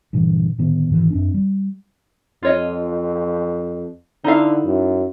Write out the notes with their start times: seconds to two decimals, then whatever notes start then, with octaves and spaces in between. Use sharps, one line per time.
0.13 G2 A#2 D3 E3
0.58 A2 D3 D#3 B3
0.90 G#2 D#3 E3
1.10 F#2 C4 D4
1.34 G3
2.43 F2 F4 C#5 D#5
4.24 D3 D#4 E4 F5
4.65 F#2